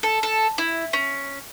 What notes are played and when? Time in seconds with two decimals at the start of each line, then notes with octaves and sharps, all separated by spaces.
0.03 A4
0.23 A4
0.58 E4
0.93 C#4